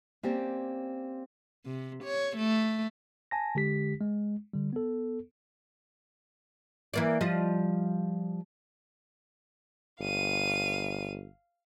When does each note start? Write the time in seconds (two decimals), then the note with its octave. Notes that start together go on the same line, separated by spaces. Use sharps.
0.23 A#3 C4 C#4 G4 C5 D5
1.66 C3
2.04 C#5
2.37 A3
3.31 G#5 A5 A#6
3.55 D3 G#3 G4 B6
4.01 G#3
4.53 D3 G3
4.73 B3 A4
6.94 E3 A#3 D5
7.21 F3 G3 D#5
10.01 G1 F5 D#7